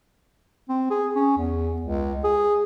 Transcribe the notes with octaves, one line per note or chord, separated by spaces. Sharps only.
C4
G#4
C#4
E2
C#2
G#4